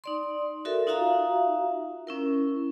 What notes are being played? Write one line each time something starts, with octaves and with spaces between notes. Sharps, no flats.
D#4 D5 C6
F#4 A4 A#4 E5
D#4 F4 F#4 E5 F5 A#5
C#4 E4 A#4